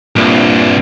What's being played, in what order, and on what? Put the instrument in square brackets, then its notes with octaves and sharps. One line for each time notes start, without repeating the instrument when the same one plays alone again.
[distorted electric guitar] C2 G2 [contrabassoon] A#2